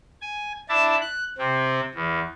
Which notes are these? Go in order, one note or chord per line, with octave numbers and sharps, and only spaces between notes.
G#5
D4 E4 E5 A5
F#6
C3 C4
E2